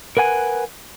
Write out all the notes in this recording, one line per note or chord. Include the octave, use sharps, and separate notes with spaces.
A#4 B4 F#5 G#5